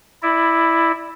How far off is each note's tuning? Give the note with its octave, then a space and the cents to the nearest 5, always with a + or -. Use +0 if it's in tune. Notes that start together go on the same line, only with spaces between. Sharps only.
E4 +0 D5 +25